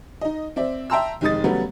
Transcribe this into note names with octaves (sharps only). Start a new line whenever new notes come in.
D#4 D#5
C4 D5 E5
E5 G5 A5 A#5 C6 E6
F1 D#3 G#3 D#6 A6
C#3 F#3 G3 A3 B3